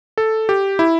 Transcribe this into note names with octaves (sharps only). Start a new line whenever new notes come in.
A4
G4
E4